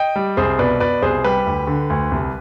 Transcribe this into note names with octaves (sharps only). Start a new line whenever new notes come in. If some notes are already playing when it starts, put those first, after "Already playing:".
Already playing: D#5 G5
G3
C2 G#4 C5
B2 B4 D5
B2 B4 D5
C2 G#4 C5
G3 G4 B4
D2
D3
D2
C2